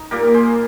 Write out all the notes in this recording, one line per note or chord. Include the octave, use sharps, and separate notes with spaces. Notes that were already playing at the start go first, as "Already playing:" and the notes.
Already playing: D#4
A#2 G3 A#3 G4 A#4
G#4 C5